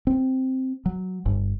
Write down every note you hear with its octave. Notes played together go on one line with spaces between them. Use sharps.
C4
F#3
G1